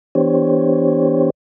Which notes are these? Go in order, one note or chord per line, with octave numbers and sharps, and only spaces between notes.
E3 B3 D4 G4 C5 C#5